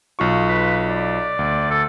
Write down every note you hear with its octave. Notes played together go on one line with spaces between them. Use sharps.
B1 F4 C#6
B4
D5
D2
A4